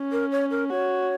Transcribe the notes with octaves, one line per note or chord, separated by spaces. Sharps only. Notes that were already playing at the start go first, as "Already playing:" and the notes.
Already playing: C#4
A#4
C#5
A#4
F#4 C#5